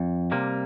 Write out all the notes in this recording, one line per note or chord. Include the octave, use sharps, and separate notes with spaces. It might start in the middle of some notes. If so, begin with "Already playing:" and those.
Already playing: F2
C3 G3 A#3